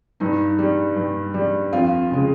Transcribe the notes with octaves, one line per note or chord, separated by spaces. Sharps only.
G2 D#4
G3
G2
G3
F2 F4
C#3 G#3